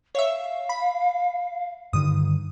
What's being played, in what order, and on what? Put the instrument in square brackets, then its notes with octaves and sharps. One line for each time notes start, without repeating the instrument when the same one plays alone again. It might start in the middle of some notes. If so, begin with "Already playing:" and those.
[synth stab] C#5 E5 [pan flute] F5
[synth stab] B5
[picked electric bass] G2 D3 D#3 [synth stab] D#6